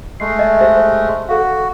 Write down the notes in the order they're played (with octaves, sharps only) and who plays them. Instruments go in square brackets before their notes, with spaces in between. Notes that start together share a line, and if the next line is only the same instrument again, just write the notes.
[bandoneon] G#3 A3 [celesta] C7
[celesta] D#5 E5
G4 C5 E5
[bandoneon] F#4 [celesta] A4 F5